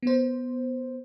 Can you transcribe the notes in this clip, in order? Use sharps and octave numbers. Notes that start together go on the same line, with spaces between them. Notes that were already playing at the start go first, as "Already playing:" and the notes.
B3 C5